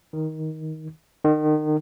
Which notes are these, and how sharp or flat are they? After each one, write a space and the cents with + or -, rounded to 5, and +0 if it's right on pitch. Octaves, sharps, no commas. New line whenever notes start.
D#3 +15
D#3 -30